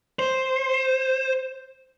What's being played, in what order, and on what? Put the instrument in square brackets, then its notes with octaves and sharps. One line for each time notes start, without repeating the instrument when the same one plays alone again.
[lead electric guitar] C5